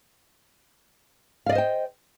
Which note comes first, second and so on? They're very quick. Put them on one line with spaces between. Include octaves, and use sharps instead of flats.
F5 D5 D#5 C5 G5